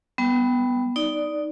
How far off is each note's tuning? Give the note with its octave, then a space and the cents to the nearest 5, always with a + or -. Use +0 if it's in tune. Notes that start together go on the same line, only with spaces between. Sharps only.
G3 +0 B3 +0
D#4 +0 D5 +0